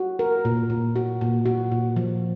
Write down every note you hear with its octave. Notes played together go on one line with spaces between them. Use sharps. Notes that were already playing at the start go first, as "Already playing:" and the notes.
Already playing: F#4
A#4
A#2
A#2
F#4
A#2
F#4
A#2
F3